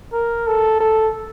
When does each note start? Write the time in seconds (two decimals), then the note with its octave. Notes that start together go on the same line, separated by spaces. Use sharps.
0.13 A#4
0.47 A4
0.81 A4